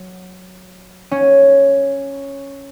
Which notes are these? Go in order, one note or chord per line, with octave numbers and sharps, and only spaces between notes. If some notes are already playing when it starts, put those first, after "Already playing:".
Already playing: F#3
C#4